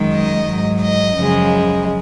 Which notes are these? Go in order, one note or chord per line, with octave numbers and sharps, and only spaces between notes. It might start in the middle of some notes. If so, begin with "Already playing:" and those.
Already playing: F#2 D#3 G#3
D#5
G#2 F#3
D#5
F#2 C#3 F3 G#3